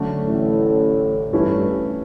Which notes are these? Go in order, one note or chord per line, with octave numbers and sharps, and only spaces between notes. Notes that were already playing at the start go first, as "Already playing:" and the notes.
Already playing: D3 F#3 A3 C#4
A1 A2
G2 E3 A3 C#4 E4